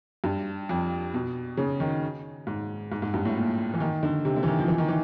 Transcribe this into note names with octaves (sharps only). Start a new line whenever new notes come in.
G2
F2
B2
C#3
D#3
G#2
G#2
G#2
G2
A2
A#2
E3
D#3
D3
C3
D3
E3
D#3
F3
E3
D#3
E3